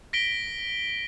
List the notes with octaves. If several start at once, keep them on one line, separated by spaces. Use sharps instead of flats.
A#6 B6 D7 G7